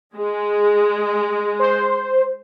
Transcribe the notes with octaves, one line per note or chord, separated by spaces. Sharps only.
G#3
C5